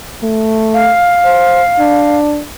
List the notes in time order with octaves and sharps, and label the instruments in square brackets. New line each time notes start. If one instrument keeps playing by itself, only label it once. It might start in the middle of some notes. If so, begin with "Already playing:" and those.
[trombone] A3
[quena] F5
[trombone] C5
D4